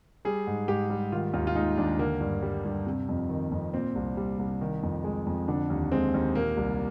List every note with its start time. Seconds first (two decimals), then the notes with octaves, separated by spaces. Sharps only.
0.25 G3 G#4
0.47 G#2
0.68 G#2 G4
0.90 G3
1.12 D#3 F4
1.34 D#2 F4
1.47 F4
1.55 G#3 D#4
1.78 D#2 D4
1.99 D3 A#3
2.21 G2
2.42 G3
2.65 G2
2.87 C3
3.09 F2
3.30 D#3
3.52 F2
3.73 A#2 C4
3.95 C2
4.17 G3
4.39 C2
4.61 D#3
4.83 F2
5.04 G#3
5.27 F2
5.48 D3 D4
5.70 D#2
5.92 G#3 C4
6.14 D#2
6.35 A#2 A#3
6.57 C2